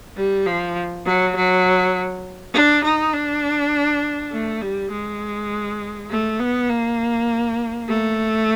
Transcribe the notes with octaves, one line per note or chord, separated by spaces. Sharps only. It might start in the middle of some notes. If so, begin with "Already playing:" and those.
G3
F3
F#3
F#3
D4
D#4
D4
A3
G3
G#3
A3
B3
A#3
A3